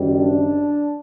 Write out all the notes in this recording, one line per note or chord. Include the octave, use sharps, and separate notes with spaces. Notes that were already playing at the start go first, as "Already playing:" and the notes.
Already playing: F#1 F#2 D#3 G3
D4